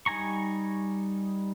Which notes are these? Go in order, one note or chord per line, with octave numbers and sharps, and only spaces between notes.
G3 D#4 G#5 A#5 C#6